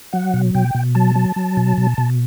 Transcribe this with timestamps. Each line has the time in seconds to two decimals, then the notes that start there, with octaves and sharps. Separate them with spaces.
0.13 F#3 F#5
0.34 B2
0.55 B2 G5
0.75 B2
0.95 F#3 A5
1.16 F#3
1.36 F#3
1.57 B2
1.78 B2
1.98 B2